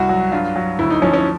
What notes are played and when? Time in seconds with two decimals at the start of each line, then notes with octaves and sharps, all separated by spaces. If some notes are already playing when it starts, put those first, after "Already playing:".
Already playing: C2 F#4
0.09 F#3
0.32 G2 F4
0.56 F#3
0.79 D2 E4
0.90 D#4
1.02 F3 C#4
1.14 C#4